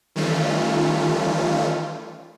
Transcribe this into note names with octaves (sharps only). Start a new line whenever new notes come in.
D#3 E3 G3 A3 C#4 F4